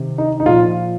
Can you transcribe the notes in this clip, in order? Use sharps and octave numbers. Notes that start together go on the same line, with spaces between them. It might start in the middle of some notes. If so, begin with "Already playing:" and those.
Already playing: C3 D#3
D#4
D#4
A#2 F3 F4